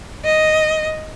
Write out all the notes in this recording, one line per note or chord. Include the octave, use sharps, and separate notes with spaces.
D#5